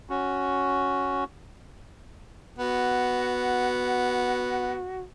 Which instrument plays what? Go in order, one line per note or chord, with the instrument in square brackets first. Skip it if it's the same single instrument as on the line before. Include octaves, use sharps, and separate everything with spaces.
[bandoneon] C#4 F#4
[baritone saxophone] B3 [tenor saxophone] F#4